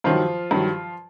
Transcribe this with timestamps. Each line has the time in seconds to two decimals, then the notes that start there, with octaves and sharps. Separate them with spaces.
0.04 G2 D#3 F3 F#3 F4
0.51 G2 D#3 F#3